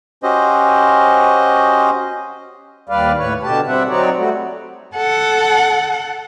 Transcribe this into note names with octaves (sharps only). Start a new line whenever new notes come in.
C#4 F#4 G4 C5 D#5
D#2 G3 B4 D5 F5
A2 B4 C#5
B2 D3 G4 A5
G3 C4 D4 E5 F#5
F#3 C4 D#4 F#4 C#5 D5
G3 A3 F#4
A4 F#5